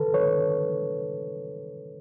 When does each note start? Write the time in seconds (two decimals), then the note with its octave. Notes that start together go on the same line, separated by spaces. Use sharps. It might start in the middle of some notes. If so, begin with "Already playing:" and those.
Already playing: A4 B4
0.14 B4 C#5